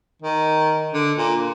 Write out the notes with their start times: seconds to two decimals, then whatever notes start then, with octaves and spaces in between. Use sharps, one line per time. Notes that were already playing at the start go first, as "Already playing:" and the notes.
0.22 D#3
0.94 D3
1.18 A#2